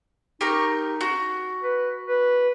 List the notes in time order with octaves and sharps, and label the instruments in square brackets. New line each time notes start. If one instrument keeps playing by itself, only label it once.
[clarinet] D#4 [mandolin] G4 A#4 C#6
[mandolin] F#4
[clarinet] B4
B4